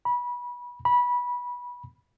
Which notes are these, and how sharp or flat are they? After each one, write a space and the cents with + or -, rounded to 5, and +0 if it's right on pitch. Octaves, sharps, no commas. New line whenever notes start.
B5 -25
B5 -20